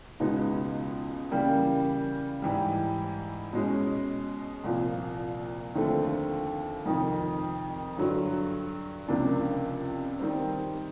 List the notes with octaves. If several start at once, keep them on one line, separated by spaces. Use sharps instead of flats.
C#2 B2 G#3 B3 D#4
C#3 E3 G3 A#3
G#2 E3 G3
B2 G#3 C#4
C2 A#2 F3
D#2 D3 F3 A3 C4
F2 C3 D#3
G2 D3 F#3
C#2 C3 F3 A#3 D4
D#3 G3 C4